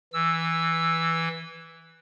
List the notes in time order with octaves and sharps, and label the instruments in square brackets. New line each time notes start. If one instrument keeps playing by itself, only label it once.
[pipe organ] E3 E6